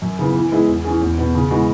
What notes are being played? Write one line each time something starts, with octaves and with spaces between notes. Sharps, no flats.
F#2
C#3 E3 B3
E3
G#3 B3 E4 G#4
E2
E3 C#4 G#4
E2
B2 B3
C#3
E3 G#3 B3 F#4